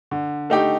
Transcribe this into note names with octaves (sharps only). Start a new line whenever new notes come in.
D3
A3 D#4 G4